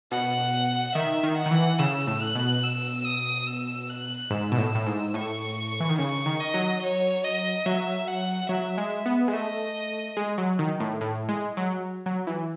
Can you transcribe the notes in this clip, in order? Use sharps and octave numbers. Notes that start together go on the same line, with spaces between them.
B2 F#5
D#3 E5
D#3
F#5
D#3
E3
C#3 E6
A2
F#6
B2
E6
D#6
E6
F#6
G#2 E6
B2
A2
A2
G#2
A2 C#6
E3
D#3
C#3 C#6
D#3
D#5
F#3
C#5
D#5
F#3 E5
F#5
F#3 E5
G#3
B3
G#3
A3 D#5
G#3
F#3
D#3
A2
A2
G#3
F#3
F#3
E3